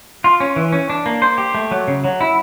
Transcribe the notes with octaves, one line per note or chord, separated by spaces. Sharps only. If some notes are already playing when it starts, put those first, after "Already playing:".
F4
C#4
E3
C#4
D4
A#3
C5
G4
A3
F#3
C#3
F#3
E4